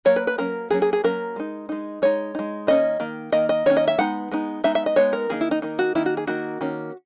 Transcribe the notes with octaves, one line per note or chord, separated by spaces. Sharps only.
F#3 A#3 C#5
B4
B4
F#3 A#3 C#4 A#4
F#3 A#3 C#4 G#4
G#4
G#4
F#3 A#3 C#4 A#4
G#3 D#4
G#3 D#4
G#3 D#4 C#5
G#3 D#4
D#3 A#3 C#4 D#5
D#3 A#3
D#3 A#3 D#5
D#5
D#3 A#3 C#4 C#5
D#5
E5
G#3 B3 D#4 F#5
G#3 B3 D#4
G#3 B3 D#4 E5
E5
D#5
G#3 B3 D#4 C#5
A#4
D#3 A#3 D#4 G#4
E4
D#4
D#3 A#3 D#4
F#4
D#3 A#3 D#4 E4
F#4
G#4
D#3 A#3 D#4 F#4
D#3 A#3 C#4